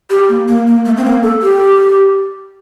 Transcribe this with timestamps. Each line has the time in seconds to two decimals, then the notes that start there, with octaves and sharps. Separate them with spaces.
0.10 G4
0.29 A#3
0.48 A#3
0.67 A#3
0.85 A3
0.97 C4
1.05 A#3
1.23 A4
1.42 G4